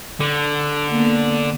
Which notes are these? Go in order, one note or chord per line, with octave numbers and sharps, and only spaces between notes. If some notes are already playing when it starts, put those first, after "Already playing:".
D3
A#3 B3